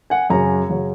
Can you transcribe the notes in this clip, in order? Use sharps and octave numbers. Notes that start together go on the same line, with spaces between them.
F#5 G#5
F#2 C#3 F#3 G#5 A#5
F#2 C#3 F#3